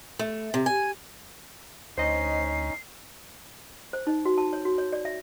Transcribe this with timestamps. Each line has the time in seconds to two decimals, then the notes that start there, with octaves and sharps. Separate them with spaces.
0.19 A3
0.54 C3
0.66 G#5
1.98 D2 C#4 D#4 C5 D#5 C7
3.93 C5
4.07 D#4
4.25 F#4
4.38 A5
4.53 C#5
4.65 F#4
4.78 C#5
4.93 D5
5.05 E5